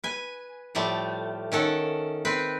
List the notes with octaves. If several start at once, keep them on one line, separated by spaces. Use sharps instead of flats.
B4 G#5
A2 F3 G3 A3
D#3 C#4 A4 F#5
C4 B4